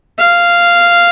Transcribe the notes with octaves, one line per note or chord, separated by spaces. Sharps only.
F5